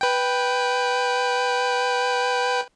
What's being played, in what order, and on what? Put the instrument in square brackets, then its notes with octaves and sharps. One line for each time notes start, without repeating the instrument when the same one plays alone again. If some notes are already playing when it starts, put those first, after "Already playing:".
[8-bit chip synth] B4 G5